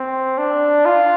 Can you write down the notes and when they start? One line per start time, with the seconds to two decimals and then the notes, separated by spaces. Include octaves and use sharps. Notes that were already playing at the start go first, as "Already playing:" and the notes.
Already playing: C4
0.38 D4
0.86 F4